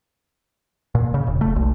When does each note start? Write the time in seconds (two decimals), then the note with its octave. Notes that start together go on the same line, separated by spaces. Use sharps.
0.95 A#2
1.14 C#3
1.27 E1
1.41 A3
1.56 B1